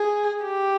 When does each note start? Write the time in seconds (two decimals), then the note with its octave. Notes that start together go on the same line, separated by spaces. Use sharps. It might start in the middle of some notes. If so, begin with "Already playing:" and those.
Already playing: G#4
0.43 G4